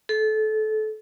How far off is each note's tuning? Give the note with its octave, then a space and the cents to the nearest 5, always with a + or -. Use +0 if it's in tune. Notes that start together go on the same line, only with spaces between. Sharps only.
A4 -25